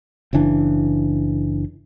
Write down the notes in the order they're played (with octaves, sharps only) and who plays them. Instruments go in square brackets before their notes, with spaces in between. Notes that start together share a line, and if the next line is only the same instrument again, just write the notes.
[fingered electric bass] F#1 C#3 E3 D4